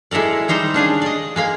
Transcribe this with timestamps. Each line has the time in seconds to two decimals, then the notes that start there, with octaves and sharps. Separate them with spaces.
0.11 G#3 E4 A4 A#4 D5
0.48 D#3 G3 D#4 C5 D#5 G5
0.74 C#4 D4 G#4 F5
1.02 D5 D#5
1.36 G#3 A#3 F5